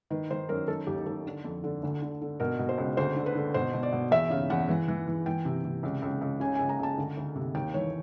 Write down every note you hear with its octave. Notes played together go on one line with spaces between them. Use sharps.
D#3 B4
D#3 C5
F#2 A#4
D#3 A4
D#2 G4
D#2 A4
D3
F2
D3
D2
D3
D3
B2 A#4
B2
C5
C#2
D2 C5
D3
B4
D3
B2 C5
B2
D5
B2
E2 E5
C#3 F5
E2 F#5
E3
E3
E3
E3 G5
C3
C3
C#2
C#2
C#2
C#3 G#5
C#2 G#5
A#5
C#2 A5
D2
D2
C3
D#2 G5
E3 C#5